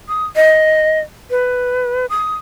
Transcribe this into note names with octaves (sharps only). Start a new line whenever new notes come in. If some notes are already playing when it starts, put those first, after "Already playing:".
D#6
D#5
B4
D#6